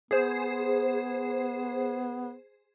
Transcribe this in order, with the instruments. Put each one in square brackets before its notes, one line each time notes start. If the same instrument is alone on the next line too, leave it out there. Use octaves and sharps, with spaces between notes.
[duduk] B3 [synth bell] G#4 C5